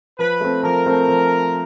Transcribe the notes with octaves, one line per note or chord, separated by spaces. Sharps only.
F3 B4
A3 C4
F3 A#4
A3 C4
F3